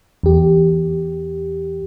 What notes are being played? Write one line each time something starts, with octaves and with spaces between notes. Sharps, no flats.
E2 G4